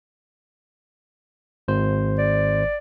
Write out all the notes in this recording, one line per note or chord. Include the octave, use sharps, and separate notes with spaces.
G#1 C5
D5